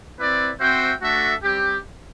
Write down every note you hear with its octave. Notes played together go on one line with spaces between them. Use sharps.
C4 E4 B4 D5
C4 F#4 C5 E5 G5
A3 D4 F#4 A4 E5
G3 C4 G4